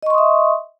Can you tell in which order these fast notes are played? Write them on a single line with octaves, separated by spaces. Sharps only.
D#5 C#6 C6 D#6 E5